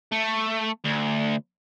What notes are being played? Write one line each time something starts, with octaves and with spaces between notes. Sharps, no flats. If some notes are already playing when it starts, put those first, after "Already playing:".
A3
D2